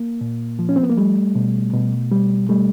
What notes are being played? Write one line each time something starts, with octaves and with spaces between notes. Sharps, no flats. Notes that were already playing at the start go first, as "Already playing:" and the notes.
Already playing: A#3
A#2
F3
C#4
C4
B3
A#3
G3 A3
B2
B2
G3
G3 A3